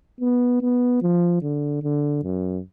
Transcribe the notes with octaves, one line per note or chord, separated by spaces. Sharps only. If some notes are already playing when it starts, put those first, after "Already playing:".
B3
B3
F3
D3
D3
F#2